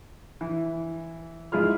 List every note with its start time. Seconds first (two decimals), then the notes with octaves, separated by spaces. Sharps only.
0.41 E3
1.52 G#2 E4 F4 G#4 F6